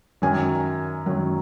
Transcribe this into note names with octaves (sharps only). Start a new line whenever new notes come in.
F#2 D#3 F#3 G#5
F#2 D#3 F#3